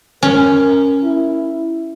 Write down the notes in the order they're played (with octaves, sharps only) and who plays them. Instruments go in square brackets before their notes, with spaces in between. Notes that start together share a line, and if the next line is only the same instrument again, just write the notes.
[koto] C#4 [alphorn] A#4
[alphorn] E4